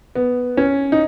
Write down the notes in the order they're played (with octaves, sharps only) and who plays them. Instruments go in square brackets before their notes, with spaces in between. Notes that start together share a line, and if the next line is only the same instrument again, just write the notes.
[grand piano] B3
C#4
D#4